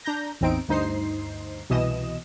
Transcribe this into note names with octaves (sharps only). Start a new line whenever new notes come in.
D4 A#5 G6 A#6
A1 E2 C4 D#4 D7
D2 G2 D#4 C5 C7
C2 B2 E3 D#5 D#6 E7